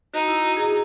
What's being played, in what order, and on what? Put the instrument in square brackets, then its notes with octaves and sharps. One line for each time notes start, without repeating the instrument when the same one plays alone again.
[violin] D#4 [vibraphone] F#4
[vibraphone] E4
F#4
G#4